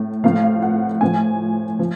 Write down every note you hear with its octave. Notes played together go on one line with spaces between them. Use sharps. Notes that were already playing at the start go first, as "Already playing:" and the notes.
Already playing: A2
A2 F3 F5
F5
F#5
A2 F3 G#5
F3